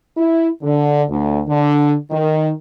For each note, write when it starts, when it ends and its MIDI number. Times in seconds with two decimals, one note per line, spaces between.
0.17 0.47 64
0.63 1.03 50
1.09 1.40 38
1.48 1.94 50
2.11 2.50 51